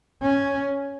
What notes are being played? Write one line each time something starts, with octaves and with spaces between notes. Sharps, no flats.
C#4